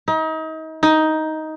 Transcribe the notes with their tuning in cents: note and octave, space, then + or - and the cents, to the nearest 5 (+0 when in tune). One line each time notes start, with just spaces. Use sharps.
D#4 +35
D#4 +10